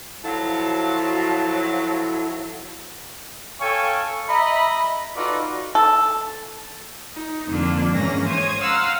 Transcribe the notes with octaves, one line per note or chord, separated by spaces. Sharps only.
F3 F#3 E4 A4 F5 A5
A4 C#5 F5 G5 G#5 C#6
D#5 E5 A#5 B5
D#4 F4 F#4 A4 B4 D5
A4
D#4
F2 D3 A#3 D4
G#2 E3 A#3 C#4 A#6
C5 C#5 D#6 G#6
F5 F#5 A#5 C6 E6